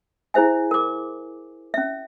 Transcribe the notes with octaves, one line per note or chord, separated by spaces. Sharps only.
E4 G#4 C5 E5 G#5
A#4 D6
C#4 E5